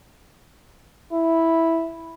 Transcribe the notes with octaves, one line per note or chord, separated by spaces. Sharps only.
E4